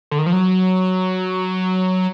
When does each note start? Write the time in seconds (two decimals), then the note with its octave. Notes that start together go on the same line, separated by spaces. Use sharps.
0.11 D3
0.19 D#3
0.26 F3
0.33 F#3